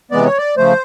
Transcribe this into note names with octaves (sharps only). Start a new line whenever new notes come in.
C3 E3 G#3 B3 D5
C#5
D5
C#3 F3 A3 C5